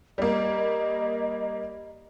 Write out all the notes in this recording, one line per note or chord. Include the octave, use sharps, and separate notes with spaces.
G3 A#3 D#5